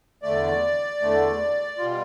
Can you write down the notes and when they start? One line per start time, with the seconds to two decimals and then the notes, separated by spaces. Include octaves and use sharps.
0.23 E2 D3 A3 D5
1.01 E2 D3 A3
1.78 B2 G3 F4